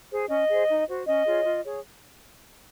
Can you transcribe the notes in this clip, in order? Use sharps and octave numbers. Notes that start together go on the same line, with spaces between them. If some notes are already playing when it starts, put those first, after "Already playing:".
G#4 C5
C#4 D#5
G#4 C5
D#4
F#4 C5
C#4 D#5
F4 G#4 C#5
F4
G#4 C#5